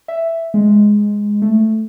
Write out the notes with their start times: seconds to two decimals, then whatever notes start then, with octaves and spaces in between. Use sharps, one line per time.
0.08 E5
0.54 G#3
1.42 A3